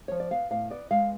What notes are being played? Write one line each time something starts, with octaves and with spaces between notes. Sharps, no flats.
F3 C#5
D5
B3 F5
A2 F5
B3 D5
G#3 F5